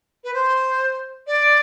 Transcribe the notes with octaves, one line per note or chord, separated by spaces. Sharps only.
B4
C5
D5